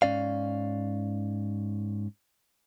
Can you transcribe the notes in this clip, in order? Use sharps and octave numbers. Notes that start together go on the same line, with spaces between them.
G#2 C#4 D5 F5